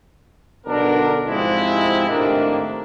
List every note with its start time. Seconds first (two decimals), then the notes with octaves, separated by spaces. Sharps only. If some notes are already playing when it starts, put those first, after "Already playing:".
0.67 B1 D3 B3 D4 A#4
1.28 G#2 C3 F3 G#3 C4 E4
2.09 A2 C3 D#3 A#3 D4